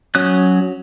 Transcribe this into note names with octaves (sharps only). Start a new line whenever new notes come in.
F#3 C#4 D#6 F#6